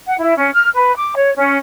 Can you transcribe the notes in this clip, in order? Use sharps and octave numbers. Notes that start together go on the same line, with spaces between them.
F#5
E4
C#4
F6
B4
D6
C#5
C#4